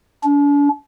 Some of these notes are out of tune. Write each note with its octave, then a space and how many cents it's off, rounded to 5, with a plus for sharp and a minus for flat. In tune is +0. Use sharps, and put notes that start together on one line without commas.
D4 -40